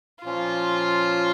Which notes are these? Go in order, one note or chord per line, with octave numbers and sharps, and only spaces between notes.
A#2 F3 A#3 C#4 F4